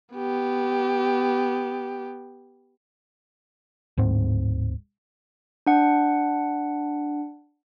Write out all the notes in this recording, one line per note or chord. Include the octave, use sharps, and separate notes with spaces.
B3 G4
D1 G#2 C4
D4 F#5